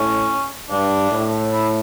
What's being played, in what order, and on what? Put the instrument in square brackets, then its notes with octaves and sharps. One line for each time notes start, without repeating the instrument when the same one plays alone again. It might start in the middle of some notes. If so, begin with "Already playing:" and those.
Already playing: [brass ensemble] A2 [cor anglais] C#4
[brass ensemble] G2 [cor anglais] D4
[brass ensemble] A2
[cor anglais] E4